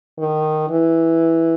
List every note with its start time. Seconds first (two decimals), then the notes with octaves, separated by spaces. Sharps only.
0.19 D#3
0.70 E3